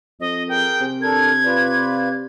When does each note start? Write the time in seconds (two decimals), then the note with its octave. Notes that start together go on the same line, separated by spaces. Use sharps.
0.20 F2 D#5
0.49 G#4 A#4 G5
0.80 C3
1.02 D4 A4 A#4 G#6
1.45 F4 B4 D5